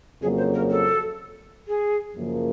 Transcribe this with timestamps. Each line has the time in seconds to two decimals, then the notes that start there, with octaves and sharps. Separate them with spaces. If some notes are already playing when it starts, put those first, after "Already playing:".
0.22 F2 C#3 F#3 A#3 G#4
0.37 C5
0.54 A#4
0.70 A4
1.67 G#4
2.16 F#2 C#3 F3 A#3